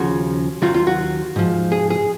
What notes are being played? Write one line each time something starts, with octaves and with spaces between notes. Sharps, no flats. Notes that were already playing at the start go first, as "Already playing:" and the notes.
Already playing: D#2 C#3 F3 F#4
D#2 D#3 F#3 F4
F4
F#4
G#2 F3
G#4
G#4